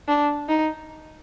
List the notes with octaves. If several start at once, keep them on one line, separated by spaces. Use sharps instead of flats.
D4
D#4